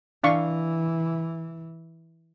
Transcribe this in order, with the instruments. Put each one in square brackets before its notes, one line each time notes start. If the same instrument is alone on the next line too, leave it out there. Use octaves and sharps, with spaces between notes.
[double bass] E3 [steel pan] D4 F5 C#6